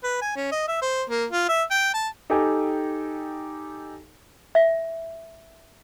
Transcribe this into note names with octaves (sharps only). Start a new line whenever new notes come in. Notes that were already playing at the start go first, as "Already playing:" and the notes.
B4
G#5
C#4
D#5
E5
C5
A#3
F4
E5
G5
A5
D#4 G4 A4 D#5 G5 G#5
E5